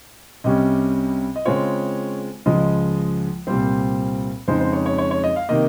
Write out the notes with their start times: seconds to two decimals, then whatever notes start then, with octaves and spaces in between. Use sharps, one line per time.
0.44 C2 C3 G3 C#4 D#5
1.36 D#5
1.45 C#3 G#3 C4 F4 C#5
2.46 C#2 C#3 F3 G#3 D#5
3.47 C2 A#2 G3 C4 C5
4.48 F2 C#3 G#3 D#4 C5
4.60 C5
4.73 C#5
4.86 C#5
4.98 C#5
5.11 C#5
5.24 D#5
5.36 F5
5.49 C3 D#3 A#3 D#5